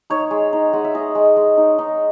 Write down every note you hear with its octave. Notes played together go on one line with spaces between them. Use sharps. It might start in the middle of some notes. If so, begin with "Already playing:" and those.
D#4 C#5
G#3
D#4
G#3 F#5
E5
G#3 D#5
G#3
G#3
D#4
D#4